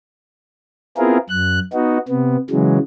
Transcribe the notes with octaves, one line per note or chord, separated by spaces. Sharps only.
B3 C4 E4 F4 G#4 A#4
F#2 F#6
B3 D#4 F#4
C3 B3
C#3 E3 F#3 G#3